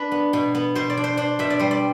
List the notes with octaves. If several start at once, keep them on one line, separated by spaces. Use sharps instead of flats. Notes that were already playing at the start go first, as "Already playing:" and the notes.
Already playing: D4 B4
B3
B2
B3
B2 C5
D5
D4
C5
D4 C5
B2 E5
D5
G3 C5
D5